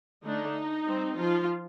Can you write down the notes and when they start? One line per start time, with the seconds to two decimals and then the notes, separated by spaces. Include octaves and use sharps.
0.24 D3 A3 D4 D#4
0.87 G3 C4
1.18 F3 F4